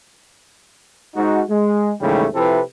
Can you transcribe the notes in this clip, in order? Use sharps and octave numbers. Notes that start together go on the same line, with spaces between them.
G#2 D#4 F#4
G#3
D#2 G#2 C#3 E3 G3 A3
C3 F3 C4 E4 A4 B4